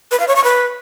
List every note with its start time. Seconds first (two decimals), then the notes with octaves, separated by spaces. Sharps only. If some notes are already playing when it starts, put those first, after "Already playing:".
0.11 B4
0.19 F5
0.28 C#5
0.36 C#6
0.44 B4